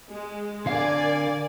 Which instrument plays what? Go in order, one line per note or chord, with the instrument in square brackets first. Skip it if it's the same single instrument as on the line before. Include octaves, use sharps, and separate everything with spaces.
[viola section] G#3
[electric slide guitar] D3 F5 [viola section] A#4 D5 G#5